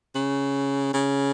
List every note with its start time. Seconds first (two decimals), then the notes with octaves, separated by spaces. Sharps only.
0.15 C#3
0.94 C#3